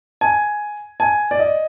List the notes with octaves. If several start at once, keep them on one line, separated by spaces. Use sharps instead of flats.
G#5
G#5
D5
D#5